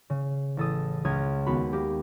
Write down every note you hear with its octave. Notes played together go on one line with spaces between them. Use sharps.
C#3
A1 A4 D#6
C#2 D#6 F6 G#6
D#2 B3 F#4 B5
A#3 G4